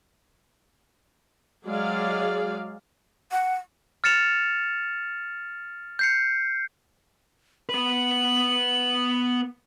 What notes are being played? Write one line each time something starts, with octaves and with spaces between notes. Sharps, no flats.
F#3 G#3 G#4 D5 F5
F#5
F6 A6 C#7 E7 F7
G6 C7 C#7
B3 B4 F#7